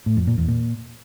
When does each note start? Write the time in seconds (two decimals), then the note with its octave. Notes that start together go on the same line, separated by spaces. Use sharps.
0.06 A2
0.17 F2
0.27 A#2
0.38 E2
0.48 A#2